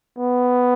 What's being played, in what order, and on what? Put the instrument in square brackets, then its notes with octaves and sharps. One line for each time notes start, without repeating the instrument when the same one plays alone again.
[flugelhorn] B3